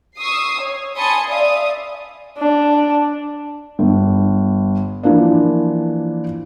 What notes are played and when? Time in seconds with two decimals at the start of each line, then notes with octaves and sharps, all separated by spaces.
0.19 C#6 D#6 E6 C7
0.60 C#5
0.97 G#5 A5 B5 C6 D#6 C#7
1.28 D5 E5 F5 D#6
2.38 D4
3.79 G1
5.03 E3 F3 A#3 D4